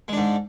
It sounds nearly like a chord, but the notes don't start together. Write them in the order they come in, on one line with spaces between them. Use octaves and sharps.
G#3 D4 G#2